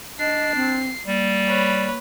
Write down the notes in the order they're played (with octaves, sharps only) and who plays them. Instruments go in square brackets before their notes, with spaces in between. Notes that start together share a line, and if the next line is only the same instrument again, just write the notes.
[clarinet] D4 [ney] D#5 [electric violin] C7
[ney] C4
[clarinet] G3 [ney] A#3
[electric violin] B4 C#5